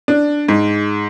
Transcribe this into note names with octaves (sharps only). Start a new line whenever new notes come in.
D4
G#2